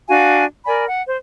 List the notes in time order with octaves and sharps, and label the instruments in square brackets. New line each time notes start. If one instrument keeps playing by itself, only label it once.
[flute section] D4 F#4 F5 G#5
A#4 D5 G#5 B5
F#5
C5